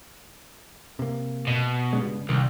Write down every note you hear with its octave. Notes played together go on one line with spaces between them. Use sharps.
C3 A#3
B2
G2 C#3 G#3
C2 D#3